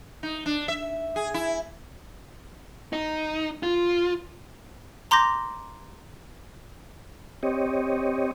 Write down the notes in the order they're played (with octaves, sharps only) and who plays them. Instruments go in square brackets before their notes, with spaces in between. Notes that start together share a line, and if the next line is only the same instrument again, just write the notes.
[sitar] D#4
D4
E5
G#4
E4
[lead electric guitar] D#4
F4
[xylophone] A#5 C6 D6 G6 A#6
[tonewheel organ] C4 G4 C#5 D#5